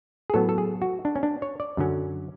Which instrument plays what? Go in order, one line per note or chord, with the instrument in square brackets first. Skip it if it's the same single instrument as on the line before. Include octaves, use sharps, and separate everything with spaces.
[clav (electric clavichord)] G#4
A2 F#3 B3 A4
A4
G#4
F#4
D4
C#4
D4
C#5
D5
F#2 D3 F#3 C#4